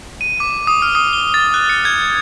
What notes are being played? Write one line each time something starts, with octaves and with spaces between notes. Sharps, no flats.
D#7
D6
D#6
F6
D#6
G7
A6
F#6
C#7
G#6